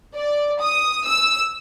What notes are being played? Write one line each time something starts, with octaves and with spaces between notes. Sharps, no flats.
D5
D#6
E6